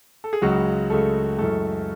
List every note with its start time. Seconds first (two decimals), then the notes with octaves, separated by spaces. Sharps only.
0.24 A4
0.33 G#4
0.42 C#2 C#3 F#3 G#3 F#4
0.90 C#2 C#3 G#3 A3 A4
1.38 F#2 E3 G#3 A3 A4